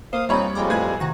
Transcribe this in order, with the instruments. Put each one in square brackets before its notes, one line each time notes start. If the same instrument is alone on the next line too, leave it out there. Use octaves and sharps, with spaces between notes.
[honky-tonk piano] A#3 [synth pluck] C5 [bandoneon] F5 D#6
[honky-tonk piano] D#2 C#5 B5 [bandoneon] A#2 D#4 [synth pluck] G3 C4
[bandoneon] F2 G3 G#3 [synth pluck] G5 A#5 D6
[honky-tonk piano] A2 G#4 G#6 [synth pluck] B4 F#6
[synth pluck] C3 D#3 A#6 [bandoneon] F#4